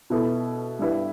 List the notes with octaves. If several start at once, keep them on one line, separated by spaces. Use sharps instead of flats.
B2 B3 E4 A4
G2 G3 E4 B4